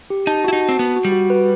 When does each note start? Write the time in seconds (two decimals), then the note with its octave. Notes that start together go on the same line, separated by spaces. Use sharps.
0.10 G4
0.27 D#4 A5
0.44 E4 F#4
0.53 D#4
0.61 A5
0.69 C4
0.79 B3 F#4
0.96 F#4
1.05 G3
1.12 F#4
1.30 B4